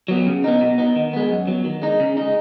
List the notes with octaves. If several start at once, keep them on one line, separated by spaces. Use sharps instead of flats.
F#3 B3
C#3
B3 D#4
B2
B3 D#4
D#3
G#3 B3
F#2
F#3 B3
D#3
G#3 D#4
C#3
G#3 D#4